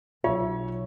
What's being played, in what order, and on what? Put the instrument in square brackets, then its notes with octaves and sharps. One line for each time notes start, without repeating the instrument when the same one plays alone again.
[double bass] B1 [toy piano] F4 [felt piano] C#5 E5